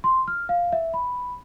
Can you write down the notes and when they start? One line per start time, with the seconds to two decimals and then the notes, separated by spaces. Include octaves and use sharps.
0.04 C6
0.28 F6
0.49 F5
0.73 E5
0.94 B5